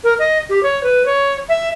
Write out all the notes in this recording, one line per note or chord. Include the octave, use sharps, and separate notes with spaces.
A#4
D#5
G4
C#5
B4
C#5
E5